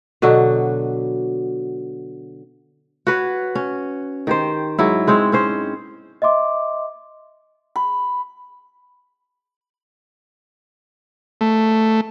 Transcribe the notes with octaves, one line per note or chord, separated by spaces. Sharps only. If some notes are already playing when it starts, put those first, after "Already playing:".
B2 D3 F#3 F#4
F#4 B4 C#5
C#4
D#3 G4 C5
G#2 F#3 E4
G#3 C4 C5 C#5
C4 C#4 C5
D#5 E5 C6 D6
B5
A3